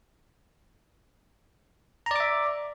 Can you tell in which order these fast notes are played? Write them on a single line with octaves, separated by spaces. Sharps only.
A#5 D5 D6 E5